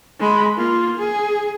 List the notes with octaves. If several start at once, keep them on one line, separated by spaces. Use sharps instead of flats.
G#3 B5
A#3 F4
G#4